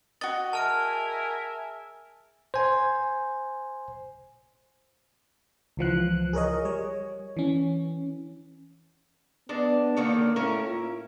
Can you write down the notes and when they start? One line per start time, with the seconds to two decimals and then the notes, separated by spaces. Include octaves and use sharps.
0.21 F#4 D#5 A6
0.53 G#4 A#4 E5 G#5 A5 F6 D7
2.54 C5 G#5
5.77 C#2 E3 F3 F#6
6.33 G#4 A#4 C#5 D#5
6.65 G3 C#5
7.37 E3 C#4
9.49 G#3 B3 D4
9.97 D3 D#3 A#3 C#5
10.36 A2 C#4 E4 A#4
10.66 F4